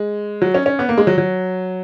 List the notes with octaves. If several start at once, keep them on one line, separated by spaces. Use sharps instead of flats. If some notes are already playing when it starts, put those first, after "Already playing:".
Already playing: G#3
F#3
C#4
C#4
B3
A#3
G#3
F#3
F#3